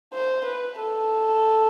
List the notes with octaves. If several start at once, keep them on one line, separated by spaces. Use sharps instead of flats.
C5
B4
A4